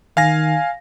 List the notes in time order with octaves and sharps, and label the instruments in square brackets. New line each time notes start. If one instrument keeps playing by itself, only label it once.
[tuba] D#3 [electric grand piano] F5 G#5 A#6